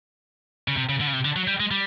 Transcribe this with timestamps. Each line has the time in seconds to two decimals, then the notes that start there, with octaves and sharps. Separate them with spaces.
0.68 C#3
0.77 C3
0.89 C#3
1.01 D3
1.07 C#3
1.13 C3
1.25 D3
1.36 F#3
1.48 G3
1.60 G#3
1.71 G3